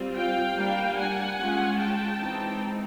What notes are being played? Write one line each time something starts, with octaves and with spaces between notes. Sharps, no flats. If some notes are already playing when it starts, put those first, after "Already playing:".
Already playing: G3 C4 F4
F5 G5
G3 A#3 D4
F#5 G#5
G#3 C#4 F4
G5 A5
E3 G#3 C4 D#4